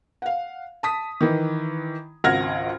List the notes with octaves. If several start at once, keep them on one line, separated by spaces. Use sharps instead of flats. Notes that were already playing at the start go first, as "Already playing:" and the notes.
F5 F#5
A5 D#6 B6
D#3 E3
G#1 C#2 F#5 F6 G#6 A#6